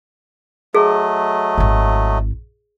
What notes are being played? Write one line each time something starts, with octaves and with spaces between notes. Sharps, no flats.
F#3 A3 G#4 D#5
G#1 E4